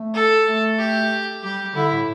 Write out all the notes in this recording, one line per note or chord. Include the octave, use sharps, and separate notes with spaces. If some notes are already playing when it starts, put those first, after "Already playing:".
Already playing: A3
A4
A3
G4
G3 G4
D3 E4
A2